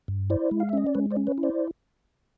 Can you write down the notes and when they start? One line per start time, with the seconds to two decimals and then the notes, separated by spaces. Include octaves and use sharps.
0.08 G2
0.30 E4 C5 D5
0.51 G#3
0.60 F5
0.69 E5
0.73 C#4 D#5
0.87 D5
0.95 G#3 B4 C#5
1.11 C5 D5
1.17 C#4
1.27 B4 C#5
1.38 E4
1.43 C5 D5